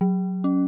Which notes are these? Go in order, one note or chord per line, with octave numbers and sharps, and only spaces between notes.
F#3
C#4